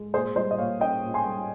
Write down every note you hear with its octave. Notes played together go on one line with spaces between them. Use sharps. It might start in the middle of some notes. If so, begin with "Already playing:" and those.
Already playing: G#3
A#2 G#4 C5
G3 C5 D#5
D#5
A#2 C#5 F5
C#4 D#5 G5
A#2
G#5 C6
G3